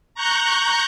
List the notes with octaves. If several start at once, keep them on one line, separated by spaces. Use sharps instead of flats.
A#5 C#6 F#6 G6